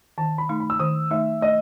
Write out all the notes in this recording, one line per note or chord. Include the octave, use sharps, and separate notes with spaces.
D#3 A5
B5
A3 D#4
B5
E6
D#3 D#6
A3 D#4 E5
A3 D#5